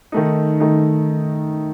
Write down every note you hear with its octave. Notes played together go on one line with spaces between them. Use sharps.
D#3 A3 D#4
D#3 A3 D#4